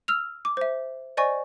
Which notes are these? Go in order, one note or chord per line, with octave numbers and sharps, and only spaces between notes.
E6 F6 F7
D6
C5 E5
C5 D5 D#5 G#5 C#6